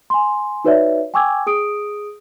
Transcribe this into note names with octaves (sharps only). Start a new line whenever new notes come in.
G#5 C6
D#4 F#4 B4 C#5 D5 E5
G5 G#5 C#6 D6 E6 G#6
G#4 D#6 D7